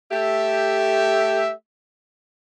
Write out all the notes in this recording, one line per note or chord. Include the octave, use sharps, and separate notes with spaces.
A3 G4 E5